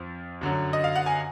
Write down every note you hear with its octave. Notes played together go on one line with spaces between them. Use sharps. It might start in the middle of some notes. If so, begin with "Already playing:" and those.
Already playing: F2 F3
F#2 D3 F#3
D#5
F5
F#5
G#5